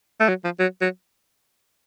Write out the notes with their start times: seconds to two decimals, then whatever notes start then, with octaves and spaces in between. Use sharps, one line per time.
0.20 A3
0.29 F#3
0.44 F3
0.59 F#3
0.81 F#3